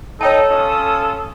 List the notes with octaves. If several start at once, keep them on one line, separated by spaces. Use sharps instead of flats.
D#4 A4 C#5 G5 A5
C#4 F4 D#6